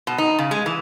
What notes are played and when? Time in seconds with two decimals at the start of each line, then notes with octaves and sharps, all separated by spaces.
0.07 B2
0.18 D#4
0.39 C#3
0.51 G#3
0.66 E3